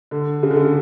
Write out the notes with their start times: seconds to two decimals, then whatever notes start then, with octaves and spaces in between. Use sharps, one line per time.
0.11 D3
0.43 C#3
0.51 D3
0.57 C#3